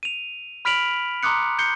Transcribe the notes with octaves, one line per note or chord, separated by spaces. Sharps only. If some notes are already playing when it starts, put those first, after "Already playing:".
D#7 F7
B5 F6 B6 D7 F7 F#7
A#5 C6 D6 D#6 F#6 C#7
G6 C7 C#7 G7